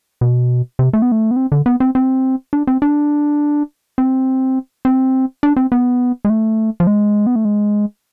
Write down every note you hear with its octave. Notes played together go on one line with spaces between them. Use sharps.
B2
C3
A3
B3
A3
B3
C4
D3
B3
C4
C4
D4
C4
D4
C4
C4
D4
C4
B3
G#3
A3
F3
G#3
B3
A3
G#3